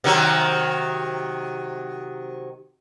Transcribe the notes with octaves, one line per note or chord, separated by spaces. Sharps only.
C3 D#3 F#3